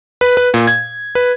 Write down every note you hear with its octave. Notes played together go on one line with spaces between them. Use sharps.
B4
B4
A#2
G#6
B4